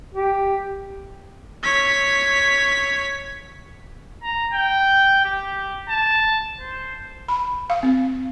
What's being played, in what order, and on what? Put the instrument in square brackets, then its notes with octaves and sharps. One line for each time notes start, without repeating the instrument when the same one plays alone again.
[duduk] G4
[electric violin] C#5 B6
[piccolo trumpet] A#5
G5
G4
A5
C5
[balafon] B5
F5
C4